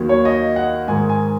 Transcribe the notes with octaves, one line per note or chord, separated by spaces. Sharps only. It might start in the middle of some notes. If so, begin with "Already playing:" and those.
Already playing: D#2 D#3 F#3
C#5
D#5
F#5
G#2 D#3 G#3 G#5
G#5